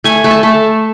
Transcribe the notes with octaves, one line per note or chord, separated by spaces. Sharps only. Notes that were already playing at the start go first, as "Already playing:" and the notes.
A3 G#5
A3
A5
A3